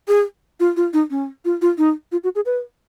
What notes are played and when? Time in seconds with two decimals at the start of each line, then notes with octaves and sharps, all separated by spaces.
0.08 G#4
0.60 F4
0.77 F4
0.93 D#4
1.10 C#4
1.45 F4
1.62 F4
1.78 D#4
2.12 F4
2.24 F#4
2.35 G#4
2.46 B4